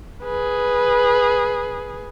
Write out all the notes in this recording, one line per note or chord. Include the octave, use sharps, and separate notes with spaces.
G#4 B4